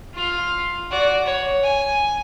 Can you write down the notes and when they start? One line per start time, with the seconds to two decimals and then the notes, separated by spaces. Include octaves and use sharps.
0.14 F4 F5
0.90 F#4 D5
1.26 C#5
1.63 G#5